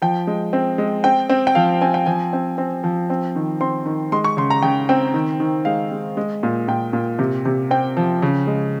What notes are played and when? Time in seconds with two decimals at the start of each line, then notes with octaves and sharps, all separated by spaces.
0.02 F3 G5
0.27 G#3
0.53 C4
0.78 G#3
1.04 C4 G5
1.29 C4
1.47 G5
1.55 F3 F5
1.81 C4 G#5
1.94 G5
2.06 F3 G#5
2.33 C4
2.58 C4
2.84 F3
3.10 C4
3.36 D#3
3.61 C4 C6
3.86 D#3
4.12 G#3 C6
4.24 C#6
4.37 C#3 C6
4.50 A#5
4.62 C#3 G5
4.89 C4 G5
5.14 D#3
5.40 D#3
5.65 G#3 F5
5.91 G#3
6.17 G#3
6.43 A#2
6.68 A#2 G5
6.93 A#2
7.19 C3
7.45 C3
7.71 C4 G5
7.97 F3
8.22 C#3
8.47 G#3